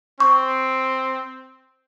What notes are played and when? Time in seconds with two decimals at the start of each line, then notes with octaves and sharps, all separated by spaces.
0.20 C4 C#6